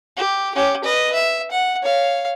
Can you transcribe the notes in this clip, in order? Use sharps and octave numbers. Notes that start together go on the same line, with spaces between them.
G4
C#4 G4
B4 D#5
E5
F#5
C#5 F5